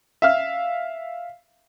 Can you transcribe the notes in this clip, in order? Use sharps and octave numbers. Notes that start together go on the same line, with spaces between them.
E5 F5 F6